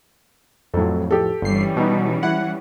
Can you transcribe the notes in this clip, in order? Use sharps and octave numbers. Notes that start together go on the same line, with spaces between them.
F2 A2 F#3 A4
G4 A4
G1 E3 G3 C#4 C7
B2 D#4
E4 F#5